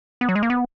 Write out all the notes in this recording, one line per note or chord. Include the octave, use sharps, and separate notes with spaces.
B3
F#3
G#3
A#3
B3